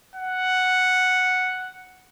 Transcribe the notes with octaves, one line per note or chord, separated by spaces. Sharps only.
F#5